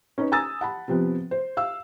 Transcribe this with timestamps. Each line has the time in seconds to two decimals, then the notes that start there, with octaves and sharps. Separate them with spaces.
0.18 C#4 D#4 B4
0.32 G#5 A#5 D#6 E6 A6
0.61 F#5 A5 B5
0.88 C3 F3 B3
1.31 C5
1.57 F5 E6